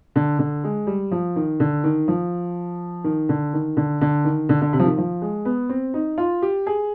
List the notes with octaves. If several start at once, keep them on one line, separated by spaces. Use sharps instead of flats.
D3
D3
G#3
G3
F3
D#3
D3
D#3
F3
D#3
D3
D#3
D3
D3
D#3
D3
D3
C3
F3
D#3
F3
G#3
B3
C4
D#4
F4
G4
G#4